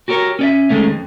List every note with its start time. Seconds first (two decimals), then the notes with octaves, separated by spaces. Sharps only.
0.08 F#4 G4 A#4 C#5
0.39 C#4 D5 E5
0.69 D#3 F3 G#3 A3 C#4
0.88 F2